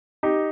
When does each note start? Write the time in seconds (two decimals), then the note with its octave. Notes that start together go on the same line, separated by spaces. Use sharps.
0.23 D#4 G4